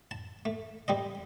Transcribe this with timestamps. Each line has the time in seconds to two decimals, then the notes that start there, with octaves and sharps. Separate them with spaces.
0.11 A5
0.45 A3
0.88 G3 C4 D#5